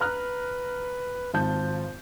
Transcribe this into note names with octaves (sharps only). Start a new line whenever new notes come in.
B4 A#5 F6 F#6
G#1 F3 A5 G6